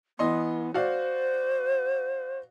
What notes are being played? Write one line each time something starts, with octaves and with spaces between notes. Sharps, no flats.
E3 B3 D#5 C6
F#4 C5 D5 F5